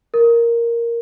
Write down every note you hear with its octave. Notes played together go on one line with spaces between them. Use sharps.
A#4